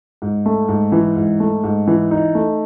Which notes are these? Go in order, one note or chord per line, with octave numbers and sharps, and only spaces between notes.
G#2
A3
G#2
E3
G#2
A3
G#2
E3
D#4
A3